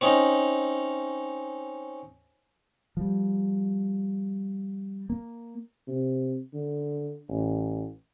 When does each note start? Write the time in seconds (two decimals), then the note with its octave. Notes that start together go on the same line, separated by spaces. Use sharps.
0.01 C4 C#4 D#4
2.97 F3 G3
5.10 A#3
5.88 C3
6.54 D3
7.29 A1